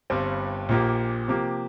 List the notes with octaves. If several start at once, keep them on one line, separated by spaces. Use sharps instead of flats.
G1 G2 G3 C4
A#1 A#2 A#3 G4
C3 F3 A#3 G4